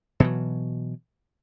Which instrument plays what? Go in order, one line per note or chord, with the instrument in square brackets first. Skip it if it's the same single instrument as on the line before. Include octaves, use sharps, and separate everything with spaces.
[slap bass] B2 E3 F#3